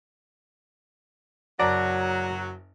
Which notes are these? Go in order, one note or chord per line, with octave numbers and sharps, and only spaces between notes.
F#1 F#3 F#4 D5 A5 A#5